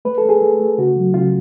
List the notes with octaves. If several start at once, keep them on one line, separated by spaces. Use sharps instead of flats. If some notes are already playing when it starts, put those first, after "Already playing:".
A3 B4
A4
A3 G#4
A3
A3
C#3 F#4
F#3
C#3 F4